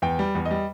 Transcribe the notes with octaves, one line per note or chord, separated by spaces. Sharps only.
E2 G5
G3
E2
D#5
G3